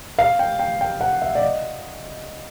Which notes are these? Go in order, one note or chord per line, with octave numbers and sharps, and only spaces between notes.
F5
G5
G5
G5
F#5
E5
D5
D#5